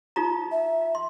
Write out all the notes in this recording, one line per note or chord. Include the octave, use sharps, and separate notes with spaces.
D#4 F4 A#5
E5
C6